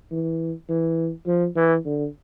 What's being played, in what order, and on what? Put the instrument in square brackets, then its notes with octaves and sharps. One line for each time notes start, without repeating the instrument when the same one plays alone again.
[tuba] E3
E3
F3
E3
D3